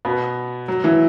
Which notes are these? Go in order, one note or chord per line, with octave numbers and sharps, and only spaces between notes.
B2 B3
F#3
E3